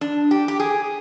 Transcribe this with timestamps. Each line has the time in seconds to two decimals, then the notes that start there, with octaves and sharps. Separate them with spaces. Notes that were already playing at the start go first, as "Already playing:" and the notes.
0.01 D4
0.31 G4
0.48 G4
0.60 G#4